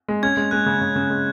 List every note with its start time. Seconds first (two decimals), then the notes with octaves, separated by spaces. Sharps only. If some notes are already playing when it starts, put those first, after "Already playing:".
0.08 G#3
0.23 C#4 G#6
0.37 G#3
0.51 G#3 F#6
0.66 C#3
0.81 C#3
0.96 C#3
1.10 G#3